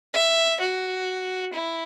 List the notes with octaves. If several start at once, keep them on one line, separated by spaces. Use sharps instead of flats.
E5
F#4
E4